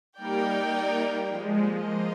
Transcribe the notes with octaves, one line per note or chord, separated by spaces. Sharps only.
G3 A#3 D#4 A#4 D5 G5
G3 A#3
F3 G#3
A#3 F4 C5 D#5